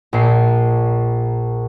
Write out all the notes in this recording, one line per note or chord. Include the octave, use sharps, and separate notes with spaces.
A#1 A#2 C7